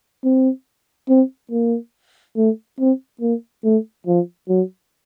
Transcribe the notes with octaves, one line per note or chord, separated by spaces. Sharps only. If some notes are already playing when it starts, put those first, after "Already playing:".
C4
C4
A#3
A3
C4
A#3
A3
F3
F#3